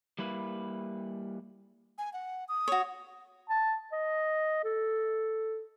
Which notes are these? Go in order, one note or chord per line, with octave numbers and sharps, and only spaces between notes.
G3 A#3 E4 B4
G#5
F#5
D#6
F#4 C#5
A5
D#5
A4